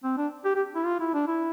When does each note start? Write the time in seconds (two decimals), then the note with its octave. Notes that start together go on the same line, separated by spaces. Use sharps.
0.04 C4
0.17 D4
0.45 G4
0.55 G4
0.75 E4
0.85 F4
1.00 E4
1.13 D4
1.27 E4